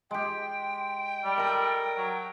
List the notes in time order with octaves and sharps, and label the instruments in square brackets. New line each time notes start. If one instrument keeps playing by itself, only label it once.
[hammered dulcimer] G#3 G4 [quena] G5
[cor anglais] G3
[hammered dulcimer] A4 E5 [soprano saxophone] A#4
[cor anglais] F#3